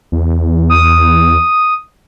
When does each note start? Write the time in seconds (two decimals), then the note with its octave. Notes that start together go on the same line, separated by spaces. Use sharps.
0.12 E2
0.70 D#6